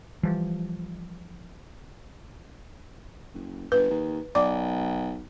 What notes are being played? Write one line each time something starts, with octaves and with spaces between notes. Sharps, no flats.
E3 F3 G3
F#1
G1 B4
D#2
B1 D5 D6